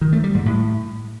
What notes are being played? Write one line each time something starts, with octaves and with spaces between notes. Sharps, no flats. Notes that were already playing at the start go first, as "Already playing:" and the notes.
D#3
A3
G3
G#2
A2